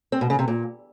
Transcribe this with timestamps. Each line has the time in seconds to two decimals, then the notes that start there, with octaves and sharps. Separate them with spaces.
0.12 C4
0.21 B2
0.30 C#3
0.39 C3
0.48 A#2